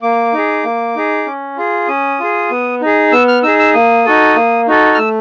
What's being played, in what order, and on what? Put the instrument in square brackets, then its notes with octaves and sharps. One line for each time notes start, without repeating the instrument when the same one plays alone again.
[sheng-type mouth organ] A#3 D6
D#4 G#4
A#3
D#4 G#4
C#4
F4 G#4
C#4 D#6
F4 G#4
B3
D#4 G#4
B3 E6
F6
D#4 G#4 E6
E6
A#3 D#6
D#4 F#4 A4
A#3
D#4 F#4 A4
F6
A3 E6